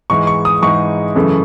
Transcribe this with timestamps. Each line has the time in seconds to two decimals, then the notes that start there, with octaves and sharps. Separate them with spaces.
0.10 G#2 E3 G#3 D#4 C#6
0.27 C#6
0.45 D#6
0.62 G#2 E3 G#3 D#4 C#6
1.15 F#2 C#3 E3 A3